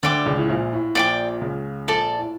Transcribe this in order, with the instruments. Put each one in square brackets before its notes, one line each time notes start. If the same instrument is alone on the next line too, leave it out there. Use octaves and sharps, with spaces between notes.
[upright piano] D2 D3 [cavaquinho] D5 G5 D6
[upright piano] C#2 C#3
A2
A#1 A#2
A2
[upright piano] A#1 A#2 [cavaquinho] D5 G5 D6
[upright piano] C#2 C#3
[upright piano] A#1 A#2 [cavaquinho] A4 D5 A5
[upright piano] A2